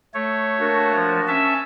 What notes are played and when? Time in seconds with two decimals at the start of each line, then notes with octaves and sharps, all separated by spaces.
0.14 A3 C#5
0.60 A#3 D4 F#4
0.95 F3
1.27 C#4 E5 A5